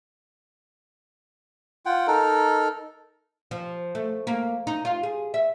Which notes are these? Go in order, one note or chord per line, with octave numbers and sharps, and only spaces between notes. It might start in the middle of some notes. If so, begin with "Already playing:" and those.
F4 F#5 G5
D#4 A4 A#4
F3
A3
A#3
D#4
F4
G#4
E5